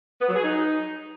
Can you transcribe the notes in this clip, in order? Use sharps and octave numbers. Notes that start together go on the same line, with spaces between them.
B3
F#3
G#4
D#4